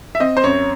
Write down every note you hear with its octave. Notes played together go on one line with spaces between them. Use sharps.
E5
C4 D#5
C5
F#2 C#5